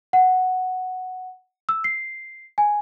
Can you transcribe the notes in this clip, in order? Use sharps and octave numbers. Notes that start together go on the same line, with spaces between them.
F#5
E6
C7
G#5